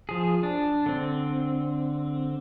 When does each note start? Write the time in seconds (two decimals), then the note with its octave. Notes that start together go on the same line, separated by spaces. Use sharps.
0.09 F3 G#4
0.43 D4
0.86 D3 C4